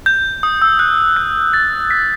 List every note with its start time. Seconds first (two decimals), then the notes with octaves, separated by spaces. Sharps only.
0.06 G6
0.43 D#6
0.62 E6
0.79 F#6
1.16 F#6
1.54 A6
1.91 B6